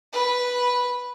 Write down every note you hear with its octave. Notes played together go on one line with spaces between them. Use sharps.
B4